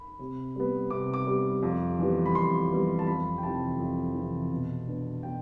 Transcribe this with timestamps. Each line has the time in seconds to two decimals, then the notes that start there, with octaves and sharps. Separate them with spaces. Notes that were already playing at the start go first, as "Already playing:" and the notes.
Already playing: B5
0.19 C3
0.56 G3 B3
0.90 C3 D6
1.14 D6
1.27 G3 B3
1.63 F2
1.99 E3 G3 B3
2.26 B5
2.35 F2 C6
2.71 E3 G3 B3
2.99 A5
3.06 F2 B5
3.38 G5
3.43 C3 E3 A5
3.79 F2
4.14 C3 E3
4.51 B2
4.88 B3 D4
5.23 B2 G5